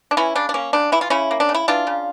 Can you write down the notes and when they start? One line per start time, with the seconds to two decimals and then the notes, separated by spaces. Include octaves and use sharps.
0.11 D4
0.17 E3 C#4 E4
0.35 C#3 D4
0.49 D4
0.54 A#3 C#4
0.73 C#3 D4
0.92 E3 E4
1.01 F4
1.10 C#3 C#4 E4
1.31 A#3
1.40 D4
1.49 C#3
1.55 E4
1.68 E3 D4 F4
1.87 C#3